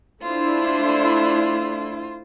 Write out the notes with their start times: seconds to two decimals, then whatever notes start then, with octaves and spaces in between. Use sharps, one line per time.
0.23 A3 D4 E4 F4 C5